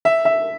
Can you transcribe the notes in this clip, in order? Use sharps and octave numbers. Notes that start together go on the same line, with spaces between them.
E5
E5